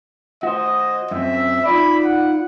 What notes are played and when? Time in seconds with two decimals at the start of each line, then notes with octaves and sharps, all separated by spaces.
0.43 F#4 C5 D#5
1.11 F#2 C4 E5
1.66 D#4 F4 D5 B5
2.05 F#5